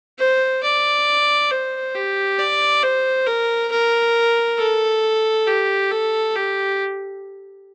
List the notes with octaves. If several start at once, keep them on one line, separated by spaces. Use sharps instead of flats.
C5
D5
C5
G4
D5
C5
A#4
A#4
A4
G4
A4
G4